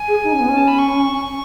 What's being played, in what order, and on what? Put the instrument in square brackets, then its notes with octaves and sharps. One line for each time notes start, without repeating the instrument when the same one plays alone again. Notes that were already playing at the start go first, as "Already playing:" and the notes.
Already playing: [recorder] G#5
[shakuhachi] G#4
D#4
C#4
B3
C#4
[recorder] A5
B5
C#6